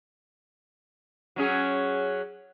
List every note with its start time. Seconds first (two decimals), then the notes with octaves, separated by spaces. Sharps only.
1.36 F#3 C#4 G#4